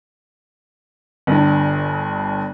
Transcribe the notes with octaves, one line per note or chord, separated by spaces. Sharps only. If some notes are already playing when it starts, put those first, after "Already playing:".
G1 G2